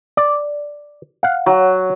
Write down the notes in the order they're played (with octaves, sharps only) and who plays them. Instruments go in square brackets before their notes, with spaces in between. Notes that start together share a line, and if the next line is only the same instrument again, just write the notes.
[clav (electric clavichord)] D5
F5 F#5
[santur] F#3